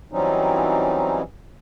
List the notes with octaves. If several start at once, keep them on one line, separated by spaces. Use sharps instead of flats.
E3 F#3 G3 C4 C#4 D#4